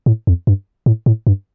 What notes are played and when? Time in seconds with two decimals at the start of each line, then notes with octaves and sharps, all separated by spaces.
0.06 A2
0.27 F2
0.47 G2
0.86 A2
1.06 A2
1.27 G2